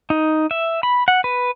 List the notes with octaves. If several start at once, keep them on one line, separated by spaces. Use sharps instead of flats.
D#4
E5
B5
F#5
B4